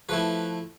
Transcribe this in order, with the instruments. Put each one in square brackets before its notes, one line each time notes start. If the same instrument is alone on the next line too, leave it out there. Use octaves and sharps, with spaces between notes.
[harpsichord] F3 A3 E4 B4